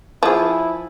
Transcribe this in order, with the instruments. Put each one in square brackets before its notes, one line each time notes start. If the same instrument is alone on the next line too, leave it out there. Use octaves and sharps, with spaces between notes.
[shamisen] F3 G#4 [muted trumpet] E4